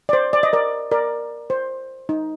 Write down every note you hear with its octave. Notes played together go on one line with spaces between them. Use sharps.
D5
C5
D5
D#5
A#4 D5
A#4 D5
C5
D#4